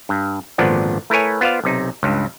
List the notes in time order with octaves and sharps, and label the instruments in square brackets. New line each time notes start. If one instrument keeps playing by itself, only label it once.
[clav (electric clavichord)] G2
G#1 A#2 D3 F3 B3 D4
A3 E4 A#4 B4 C#5 G#5
B3 F4 C5 D5 F5
B1 C3 D#4
C#2 G2